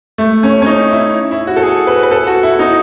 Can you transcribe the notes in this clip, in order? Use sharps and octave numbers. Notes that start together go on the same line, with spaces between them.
A3
C#4
C#4
D#4
E4
E4
F#4
A4
G#4
B4
B4
A4
F#4
E4
D#4